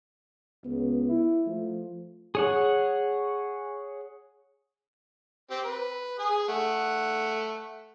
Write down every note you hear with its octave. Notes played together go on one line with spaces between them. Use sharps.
C#2 B3
E4
F3 A3
G#4 C#5 F#5
C4 G4
B4
G#4 G#5 D#6
A3 F#5